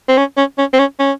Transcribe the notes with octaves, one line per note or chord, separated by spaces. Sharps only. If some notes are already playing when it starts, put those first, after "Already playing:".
C4
C#4
C#4
C#4
C4
C#4
C#4